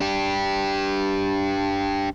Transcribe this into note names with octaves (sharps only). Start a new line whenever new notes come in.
D4 G4